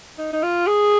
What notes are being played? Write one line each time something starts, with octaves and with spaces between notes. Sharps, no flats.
D#4
D#4
F4
G#4